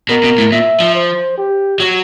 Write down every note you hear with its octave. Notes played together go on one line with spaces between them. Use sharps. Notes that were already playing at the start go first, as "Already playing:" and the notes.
B2 A#4
B2
A2
A#2 E5
F3
C5
G4
F#3